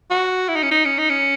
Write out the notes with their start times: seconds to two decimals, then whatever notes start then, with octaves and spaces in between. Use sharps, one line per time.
0.11 F#4
0.48 E4
0.56 D#4
0.63 C#4
0.71 D#4
0.85 C#4
0.98 D#4
1.10 C#4